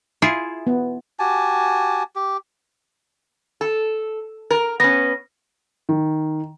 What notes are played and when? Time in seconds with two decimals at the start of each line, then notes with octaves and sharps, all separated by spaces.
0.22 E4 F4 G#4
0.67 B3
1.19 F#4 G4 G#5 A5
2.16 G4
3.61 A4
4.51 A#4
4.80 B3 C#4 A#6
5.89 D#3